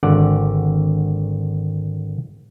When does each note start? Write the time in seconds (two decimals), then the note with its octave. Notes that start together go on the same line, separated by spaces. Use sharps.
0.03 G#1 D3 D5 F#5